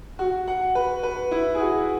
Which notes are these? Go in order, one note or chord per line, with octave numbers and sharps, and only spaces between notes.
F#4
F#5
B4
B4
E4
G#4
F#4